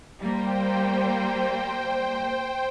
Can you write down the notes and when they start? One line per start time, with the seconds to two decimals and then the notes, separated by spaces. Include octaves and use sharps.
0.19 G3 A#3 C5 G5